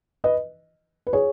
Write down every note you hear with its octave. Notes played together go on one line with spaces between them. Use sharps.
B4 D#5
B4
G#4 C#5